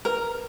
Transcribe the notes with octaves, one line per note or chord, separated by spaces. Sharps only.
A#4 B4